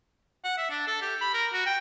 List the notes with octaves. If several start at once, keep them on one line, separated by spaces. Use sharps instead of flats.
F#5
E5
D4
A4
G4
B5
A#4
F#4
G5